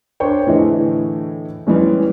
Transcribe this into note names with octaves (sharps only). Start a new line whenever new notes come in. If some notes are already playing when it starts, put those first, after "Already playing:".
D4 C5 C#5 G5
A2 D3 E3 E4 G#4 D#5
E3 G3 G#3 C#4